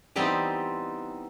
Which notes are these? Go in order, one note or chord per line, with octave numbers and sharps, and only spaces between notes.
E3 G3 B3 C4 D#4